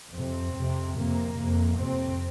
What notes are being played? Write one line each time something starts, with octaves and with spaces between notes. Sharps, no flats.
F2 C3 C4
F2 C3
F2 C3 A#3
F2 C3
F2 C3 C4